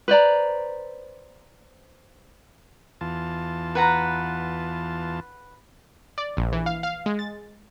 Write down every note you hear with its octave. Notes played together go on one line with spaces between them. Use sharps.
B4 C5 D5 A#5
E2 F4 A5
B4 F#5 A#5
D5
A#1
E3
F5
F5
G#3
A6